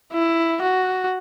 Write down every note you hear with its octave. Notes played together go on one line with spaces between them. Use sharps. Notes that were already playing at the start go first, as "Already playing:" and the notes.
E4
F#4